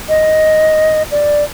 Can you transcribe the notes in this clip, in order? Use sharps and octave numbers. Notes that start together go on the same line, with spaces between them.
D#5
D5